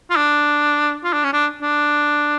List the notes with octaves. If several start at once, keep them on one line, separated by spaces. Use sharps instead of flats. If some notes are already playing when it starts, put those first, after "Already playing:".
F4
D4
F4
D4
C#4
D4
D4